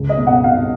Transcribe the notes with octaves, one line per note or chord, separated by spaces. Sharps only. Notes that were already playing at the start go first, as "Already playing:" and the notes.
Already playing: C#2
D#5
B2
F#5
B2 F5